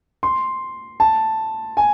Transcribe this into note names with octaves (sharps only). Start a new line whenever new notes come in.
C6
A5
G#5